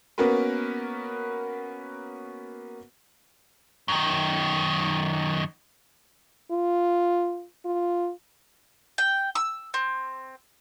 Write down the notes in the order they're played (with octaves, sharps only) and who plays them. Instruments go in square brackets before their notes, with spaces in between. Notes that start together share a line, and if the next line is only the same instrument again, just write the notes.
[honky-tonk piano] A#3 B3 C#4 F#4 A#4 B4
[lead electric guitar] F#2 D#3
[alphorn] F4
F4
[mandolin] G5
E6
C4